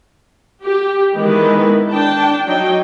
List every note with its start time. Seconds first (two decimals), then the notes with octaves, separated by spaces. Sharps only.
0.64 G4
1.15 D#3 E3 G#3 B3 B4
1.91 D4 G5 A5
2.46 F#3 D#4 G5